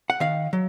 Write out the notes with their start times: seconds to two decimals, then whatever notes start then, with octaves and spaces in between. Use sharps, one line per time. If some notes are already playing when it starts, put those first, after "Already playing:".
0.10 F#5
0.20 D#3 F5
0.53 F#3